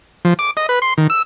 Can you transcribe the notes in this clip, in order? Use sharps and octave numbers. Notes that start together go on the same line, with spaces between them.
F3
D6
D#5
B4
C6
D#3
E6